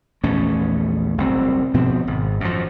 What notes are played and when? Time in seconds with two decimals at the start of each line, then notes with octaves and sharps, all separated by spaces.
0.23 A#1 E2 A3 C#4
1.18 F#1 C2 C4
1.74 B2 F3 B3 C4
2.07 G#1
2.41 F#2 F3